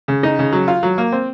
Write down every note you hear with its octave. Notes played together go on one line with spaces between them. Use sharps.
C#3
D#4
C#3
F#3
F4
F#3
A#3
C4